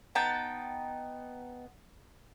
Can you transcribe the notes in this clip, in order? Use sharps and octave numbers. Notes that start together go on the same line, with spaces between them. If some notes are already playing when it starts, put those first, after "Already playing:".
B3 D#4 G5 A5